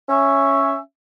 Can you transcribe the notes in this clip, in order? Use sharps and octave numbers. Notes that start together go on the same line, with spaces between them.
C#4 E5